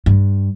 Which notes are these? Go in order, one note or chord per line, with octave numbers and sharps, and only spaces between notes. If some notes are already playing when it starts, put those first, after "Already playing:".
G2